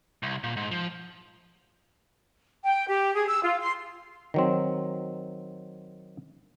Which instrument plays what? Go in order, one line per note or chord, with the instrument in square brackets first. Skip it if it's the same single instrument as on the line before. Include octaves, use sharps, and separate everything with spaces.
[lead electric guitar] C2
A#2
G#2
F3
[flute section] G5
G4
G#4
E6
F4
C6
[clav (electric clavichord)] D#3 F#3 C4